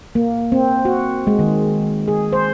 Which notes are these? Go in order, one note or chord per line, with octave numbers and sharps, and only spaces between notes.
A#3
C4
F#4
G#3
D#3
G#4
C5